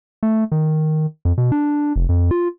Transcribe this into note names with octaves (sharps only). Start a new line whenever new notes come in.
A3
D#3
F2
B2
D4
F1
F2
F4